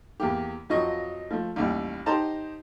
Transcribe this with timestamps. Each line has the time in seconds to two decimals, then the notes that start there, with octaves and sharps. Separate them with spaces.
0.20 E2 A#3 G4
0.70 F2 F3 F#3 D#5 C#6
1.31 F3 A3
1.56 A1 D#2 G3
2.06 D#4 G4 C5 D#5 A5 A#5